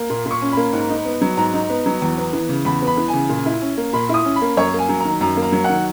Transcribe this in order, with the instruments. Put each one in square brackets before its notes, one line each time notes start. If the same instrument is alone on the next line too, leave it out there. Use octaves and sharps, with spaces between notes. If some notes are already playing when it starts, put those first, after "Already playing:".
Already playing: [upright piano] A#3
A#2
A#2
C#6
C#4
A#3 B5
G#2
D#4
B3
F#3
G#2 A#5
D#4
B3
F#3
E2
B3
E3
C#3
E2 B5
B3
B5
E3
C#3 G#5
A#2
E4
C#4
A#3
A#2 B5
E4 D#6
C#4
B5
A#3
F#2 C#5
A#3
G#5
F#3
D#3 A#5
F#2 A#5
A#3
A#5
F#3
D#3 F#5